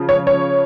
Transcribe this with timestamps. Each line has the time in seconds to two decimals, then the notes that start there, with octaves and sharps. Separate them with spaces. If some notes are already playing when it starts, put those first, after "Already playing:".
Already playing: C#3 F3
0.09 C#5
0.27 C#5